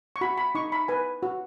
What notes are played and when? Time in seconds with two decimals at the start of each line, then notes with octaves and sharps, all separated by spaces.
0.16 C#6
0.21 F#4 B5
0.38 B5
0.55 D#4 C#6
0.72 B5
0.88 B4 G#5
1.23 F#4